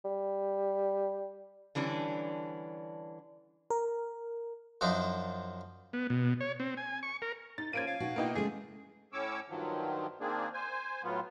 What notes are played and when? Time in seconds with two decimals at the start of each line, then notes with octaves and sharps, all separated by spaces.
0.05 G3
1.75 D3 E3 G3 C#4 D4
3.70 A#4
4.81 F#2 F3 D4 D#4
5.93 B3
6.10 B2
6.41 C#5
6.60 C4
6.77 G#5
7.03 C#6
7.22 A#4
7.58 D#4 A6
7.73 F3 A#3 C#4 C5 G#6 D7 D#7
7.87 F5
8.00 B2 D#4 F#4
8.16 B2 A#3 B3 D#4 E4 G5
8.35 C#3 G#3 A3 G#4
9.13 A2 C#4 C#5 D6 E6
9.49 G2 D#3 F3 F#3
10.21 D#3 A#3 C4 D4 G#4
10.54 C5 G#5
11.03 A2 F#3 B3 F4